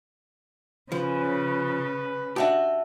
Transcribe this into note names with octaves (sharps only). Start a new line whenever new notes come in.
C#3 F3 B4
D4 F#4 G4 E5 A5